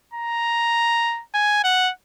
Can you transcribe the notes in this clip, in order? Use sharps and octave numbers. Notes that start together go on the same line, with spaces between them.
A#5
G#5
F#5